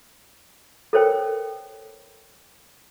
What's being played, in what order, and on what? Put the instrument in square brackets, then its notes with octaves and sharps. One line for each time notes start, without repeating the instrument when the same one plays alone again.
[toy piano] A4 A#4 C5 C#5 G5